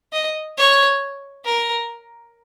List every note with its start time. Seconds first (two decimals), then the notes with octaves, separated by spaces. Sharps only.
0.13 D#5
0.58 C#5
1.45 A#4